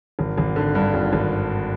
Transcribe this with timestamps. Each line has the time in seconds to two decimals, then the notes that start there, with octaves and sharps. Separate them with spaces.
0.19 G#1
0.38 G#1
0.56 D3
0.75 G2
0.94 G#1
1.13 G#1